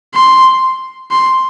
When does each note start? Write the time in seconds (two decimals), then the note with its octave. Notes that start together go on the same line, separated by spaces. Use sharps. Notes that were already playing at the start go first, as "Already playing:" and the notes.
0.14 C6
1.11 C6